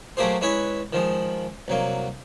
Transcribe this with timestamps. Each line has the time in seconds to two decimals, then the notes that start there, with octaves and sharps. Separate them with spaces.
0.17 F#3 A3 A#3 G4 G#4 C5
0.41 G#3 C#4 E4 B4 C#5
0.93 D#3 F3 G#3
1.68 C2 F#3 A#3